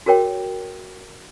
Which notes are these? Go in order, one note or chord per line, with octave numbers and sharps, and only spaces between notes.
F#4 G#4 A#4 C#5 G5